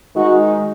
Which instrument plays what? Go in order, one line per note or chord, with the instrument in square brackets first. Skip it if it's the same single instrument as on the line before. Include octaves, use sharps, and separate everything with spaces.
[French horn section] D#3 G#3 D#4 F#4